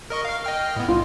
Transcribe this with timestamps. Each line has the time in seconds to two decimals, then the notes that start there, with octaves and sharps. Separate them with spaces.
0.10 A#4 D#5 C#6
0.25 F5 F6
0.44 D#5 G5 F6
0.76 A2 B3
0.88 C2 F4